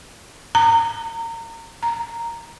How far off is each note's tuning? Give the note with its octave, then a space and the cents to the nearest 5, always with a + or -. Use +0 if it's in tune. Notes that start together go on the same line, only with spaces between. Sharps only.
A#5 -25
A#5 -5